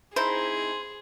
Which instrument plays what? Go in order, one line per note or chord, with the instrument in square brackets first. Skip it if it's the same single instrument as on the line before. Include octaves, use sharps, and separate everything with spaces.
[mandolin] C4 D#4 E4 [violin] G#4 [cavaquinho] C5